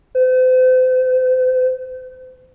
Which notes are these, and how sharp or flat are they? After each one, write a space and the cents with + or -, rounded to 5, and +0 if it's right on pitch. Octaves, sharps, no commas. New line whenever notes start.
C5 -40